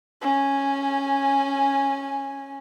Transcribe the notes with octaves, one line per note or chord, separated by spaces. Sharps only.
C#4 G#5